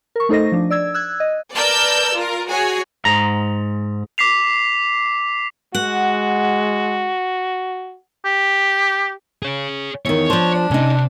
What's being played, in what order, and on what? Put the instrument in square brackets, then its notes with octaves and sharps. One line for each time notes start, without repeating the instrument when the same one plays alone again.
[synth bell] A#4 C#6
A3 D#4 A4 C5 D#5 A#6
F3 D4
D5 E6 G#6
E6 F#6 G#6
D#5
[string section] A#4 B4 D5 A5 E6 G6
F4 A#4
F#4 G#4 C#5 G#5
[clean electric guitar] G#2 A#5
[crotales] D6 B6 C7 F7
[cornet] G#3 [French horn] F#4 [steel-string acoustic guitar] F#5
[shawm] G4
[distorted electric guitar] G#4 C#5
[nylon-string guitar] E2 D#3 [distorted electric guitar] C#5
[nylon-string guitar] F3 C5 [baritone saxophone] D4
[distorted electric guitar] C3 G4 [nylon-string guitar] C#4 D#4